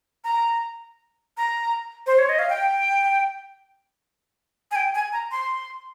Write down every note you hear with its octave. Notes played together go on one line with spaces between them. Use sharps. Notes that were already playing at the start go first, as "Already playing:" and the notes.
A#5
A#5
C5
C#5
D#5
F5
G5
G#5
G5
G#5
A#5
C6